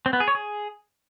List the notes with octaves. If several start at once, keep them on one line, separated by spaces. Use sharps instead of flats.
C4
B3
G#4
C#5
G#4